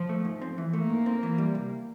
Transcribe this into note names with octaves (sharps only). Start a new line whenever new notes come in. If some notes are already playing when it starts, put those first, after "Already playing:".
Already playing: F3
A3
G#2
C4
E3
A3 A#3
G#2
C4
E3
G3
C2